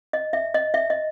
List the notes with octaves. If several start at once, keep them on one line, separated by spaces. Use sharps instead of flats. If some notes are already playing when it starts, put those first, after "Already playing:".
D#5
E5
D#5
E5
D#5